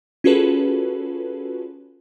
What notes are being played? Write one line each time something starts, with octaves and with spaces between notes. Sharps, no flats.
C#4 F4 F#4 G#4 A4 B4